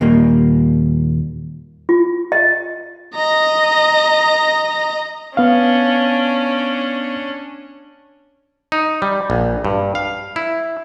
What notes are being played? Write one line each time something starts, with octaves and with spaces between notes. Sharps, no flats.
D#2 A#2 G3 A#3
F4
D#5
D#5 A#5
B3 C#4 D4 F5
D#4
G3
A#1
G2
F5
E4